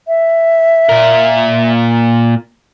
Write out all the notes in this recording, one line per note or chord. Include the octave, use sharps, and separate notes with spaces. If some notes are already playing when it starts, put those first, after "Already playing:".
E5
A#2 A#4